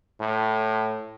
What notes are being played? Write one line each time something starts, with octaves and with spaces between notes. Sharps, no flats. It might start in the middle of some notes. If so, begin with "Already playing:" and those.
A2